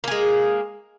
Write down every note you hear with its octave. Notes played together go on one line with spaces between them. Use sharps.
G#3 A#3 G#4